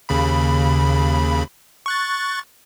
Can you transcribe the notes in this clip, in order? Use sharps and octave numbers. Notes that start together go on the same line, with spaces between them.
D#2 C#3 B5
C#6 F#6 A6